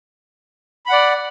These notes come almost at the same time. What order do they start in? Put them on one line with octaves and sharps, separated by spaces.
B5 F#5 D5